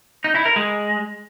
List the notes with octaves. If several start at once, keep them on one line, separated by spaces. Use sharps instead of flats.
D#4
E4
A#4
G#3